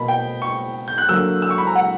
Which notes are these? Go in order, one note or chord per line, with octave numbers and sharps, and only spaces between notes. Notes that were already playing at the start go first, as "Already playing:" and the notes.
Already playing: B2 A#3 B5
G5
C#6
G6
F#6
D3 F#3 A#3 E6
E6
C#6
B5
A#5
F#5